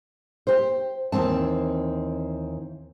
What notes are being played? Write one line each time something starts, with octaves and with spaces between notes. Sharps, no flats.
G4 C5
D#2 E3 C4 A5